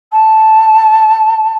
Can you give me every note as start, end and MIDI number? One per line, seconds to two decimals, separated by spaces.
0.12 1.57 81